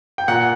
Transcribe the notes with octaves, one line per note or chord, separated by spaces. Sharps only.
G5
A#2 F#5